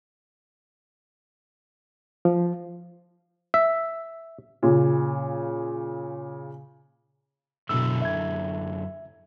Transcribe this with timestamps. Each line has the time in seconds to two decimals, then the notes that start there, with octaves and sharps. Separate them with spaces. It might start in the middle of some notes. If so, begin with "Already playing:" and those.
2.25 F3
3.54 E5
4.63 A#2 C#3
7.69 F#2 B2 D3 E4 E6
8.02 E5 G#6